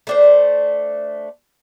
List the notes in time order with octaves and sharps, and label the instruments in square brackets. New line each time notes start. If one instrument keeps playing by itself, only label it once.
[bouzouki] A3 D4 C5